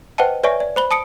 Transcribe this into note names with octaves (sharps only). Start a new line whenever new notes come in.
B4 C5 D#5 F#5 G5 A5
B4 C#5 D5 E5 G#5 C#6
D5
C5 B5 G7
A5 D#6 C#7 D7